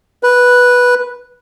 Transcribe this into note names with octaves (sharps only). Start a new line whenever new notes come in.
B4